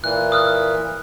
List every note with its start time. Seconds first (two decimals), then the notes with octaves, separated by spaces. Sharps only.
0.04 A#2 E3 F#6
0.32 D#6 F6 F#6